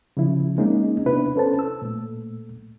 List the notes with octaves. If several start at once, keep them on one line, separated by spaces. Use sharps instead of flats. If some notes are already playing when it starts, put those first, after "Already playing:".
C#3 F3 E4
G#3 A#3 C4 C#4 D#4
C3 B3 D4 E4 B4
C#4 A4 C5 A5
E6
A#2 A3